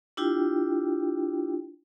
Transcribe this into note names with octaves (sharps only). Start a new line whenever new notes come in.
D4 E4 F4 G4 G5